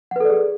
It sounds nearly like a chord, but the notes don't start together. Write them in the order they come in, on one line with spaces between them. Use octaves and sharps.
F#5 B4 A4 D5 G#4